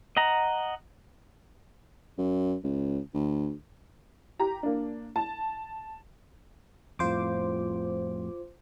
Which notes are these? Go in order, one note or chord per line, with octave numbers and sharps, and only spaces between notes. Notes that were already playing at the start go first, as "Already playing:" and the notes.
D#5 F#5 A#5
F#2
C#2
D2
G4 A#5
A#3 D4
A5
F2 A2 F4 C5 D6